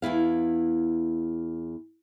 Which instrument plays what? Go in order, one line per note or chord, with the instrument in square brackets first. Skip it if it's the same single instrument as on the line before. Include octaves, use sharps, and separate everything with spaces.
[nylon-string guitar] E2 G2 E4 F5